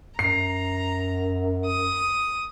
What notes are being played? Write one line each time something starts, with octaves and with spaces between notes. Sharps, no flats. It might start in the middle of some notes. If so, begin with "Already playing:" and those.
F#2 A#5 C7
D#6